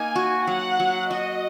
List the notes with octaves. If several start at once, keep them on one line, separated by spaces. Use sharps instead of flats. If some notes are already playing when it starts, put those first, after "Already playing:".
Already playing: A#3 D#4 G#5
F#4
F#3 F#5
F#3
F#4 D#5